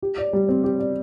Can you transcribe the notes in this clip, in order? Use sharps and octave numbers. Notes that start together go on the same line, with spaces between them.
G4
D5
G3
C4
G4
D5